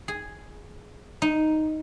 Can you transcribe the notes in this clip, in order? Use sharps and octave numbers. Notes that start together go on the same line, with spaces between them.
G#4
D#4